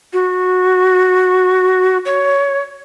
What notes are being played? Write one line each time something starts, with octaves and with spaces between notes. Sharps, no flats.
F#4
C#5